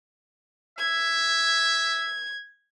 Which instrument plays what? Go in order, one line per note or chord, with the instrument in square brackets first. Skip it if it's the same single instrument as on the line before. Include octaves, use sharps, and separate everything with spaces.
[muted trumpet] E5 [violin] G#6